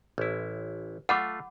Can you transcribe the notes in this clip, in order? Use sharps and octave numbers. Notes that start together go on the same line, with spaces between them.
A1 E4
A3 F4 F#5 B5 D6